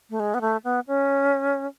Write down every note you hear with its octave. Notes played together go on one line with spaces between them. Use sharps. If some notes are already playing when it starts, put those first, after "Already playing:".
A3
G#3
B3
A3
B3
C#4